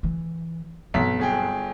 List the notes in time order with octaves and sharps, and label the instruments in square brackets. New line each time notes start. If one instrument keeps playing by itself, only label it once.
[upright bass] E3
[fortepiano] B1 [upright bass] G2 C4 [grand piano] B6
[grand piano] G1 G#4 G5